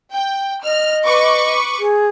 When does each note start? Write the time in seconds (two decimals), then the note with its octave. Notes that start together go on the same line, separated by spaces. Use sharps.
0.14 G5
0.64 D#5 F6
1.06 B4 C#6 D6
1.79 G#4